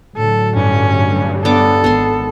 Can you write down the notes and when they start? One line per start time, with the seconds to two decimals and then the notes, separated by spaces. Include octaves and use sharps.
0.17 A2 D3 F#3 A4
0.56 G2 C#4
1.45 B3 D4 A4 D6
1.84 G#1 B3 C6